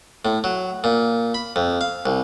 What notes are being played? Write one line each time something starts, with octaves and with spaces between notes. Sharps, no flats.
A2
F#3
A#2
B5
F2
F5
C2